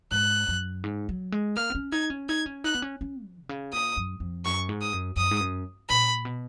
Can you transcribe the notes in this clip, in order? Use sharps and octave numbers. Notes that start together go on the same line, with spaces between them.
G#2 F#6
F#2
G#2
F#3
G#3
A#3 F6
B3
C#4
D#4 G#6
C#4
D#4 G#6
C#4
D#4 F#6
B3
C#4
C#4
F3
B2
C#3
A#2 D#6
F#2
F2
F#2 C#6
G#2
D#6
F#2
F#2 D#6
G#2
F#2
A#2 B5
B2